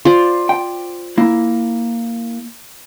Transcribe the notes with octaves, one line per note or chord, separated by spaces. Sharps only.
F4 C5 D5
G5
A#3 E4